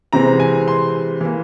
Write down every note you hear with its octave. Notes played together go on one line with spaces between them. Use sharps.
C3 E3 G#3 C4 A#5
G#5
C6
E3 A#3